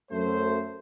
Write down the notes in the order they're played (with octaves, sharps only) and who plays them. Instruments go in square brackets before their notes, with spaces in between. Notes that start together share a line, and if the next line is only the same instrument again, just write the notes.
[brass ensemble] F#2 A3 C5